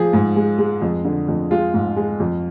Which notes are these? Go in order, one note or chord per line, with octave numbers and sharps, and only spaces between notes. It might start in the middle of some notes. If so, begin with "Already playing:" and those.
Already playing: F3 G#4
G#2
G#3
G#3
F2
D3
F2
G#3 F4
G#2
G#3
F2